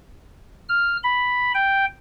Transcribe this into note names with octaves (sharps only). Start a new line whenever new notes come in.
F6
B5
G5